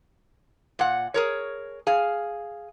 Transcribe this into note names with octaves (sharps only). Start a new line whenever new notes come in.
A#2 F#5
G#4 A#4 C#5
G#4 F5